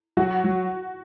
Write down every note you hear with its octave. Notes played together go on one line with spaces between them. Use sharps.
F#3 F#4
F#3